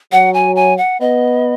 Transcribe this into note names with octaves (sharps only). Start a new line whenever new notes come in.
F#3 F#5
G#5
G#5
F#5
B3 D#5